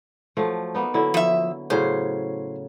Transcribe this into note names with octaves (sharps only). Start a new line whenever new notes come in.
F3 F#3 A3
A#3 B3 D#4
D3 F#3 E4
F3 E5
A2 C#3 F#3 C5